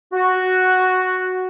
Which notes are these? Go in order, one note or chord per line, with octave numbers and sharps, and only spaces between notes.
F#4